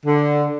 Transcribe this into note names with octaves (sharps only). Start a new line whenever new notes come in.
D3